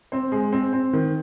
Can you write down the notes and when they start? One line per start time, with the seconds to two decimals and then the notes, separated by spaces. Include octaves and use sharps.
0.12 C4 C5
0.32 G#3
0.53 C4
0.73 C4
0.93 D#3